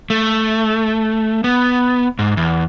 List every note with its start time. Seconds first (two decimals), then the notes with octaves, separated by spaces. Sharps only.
0.10 A3
1.44 B3
2.19 G#2
2.37 E2